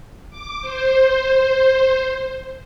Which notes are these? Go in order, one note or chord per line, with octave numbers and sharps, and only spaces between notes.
D6
C5